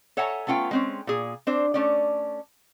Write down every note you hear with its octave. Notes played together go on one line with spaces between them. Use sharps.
A4 C#5 E5 F#5 G#5 A#5
A3 B3 C#4 F4 G5
G#3 C4 C#4
A#2 G#4
C4 D4 C5
A3 C#4 D5